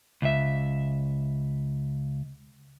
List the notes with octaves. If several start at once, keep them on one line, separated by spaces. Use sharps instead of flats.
C#2 E5